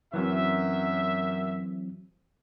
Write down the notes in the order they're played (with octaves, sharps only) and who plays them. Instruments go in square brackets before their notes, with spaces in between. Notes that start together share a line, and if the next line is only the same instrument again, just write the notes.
[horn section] F#2 E5 [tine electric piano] E3 F#3 C4